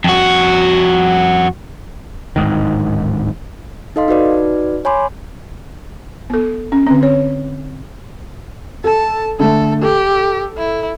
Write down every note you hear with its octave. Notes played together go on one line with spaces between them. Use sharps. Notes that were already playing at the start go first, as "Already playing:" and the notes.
F2 F#4
D1 G#2 D#3
D#4 A4 D#5 F5 C6
D#4 F#4 B4 D5
C#5 G#5 B5 C6 D6
B3 A4
C#4
D3 C4
C#5
A4 A5
D3 A3 A4
G4 A4
E4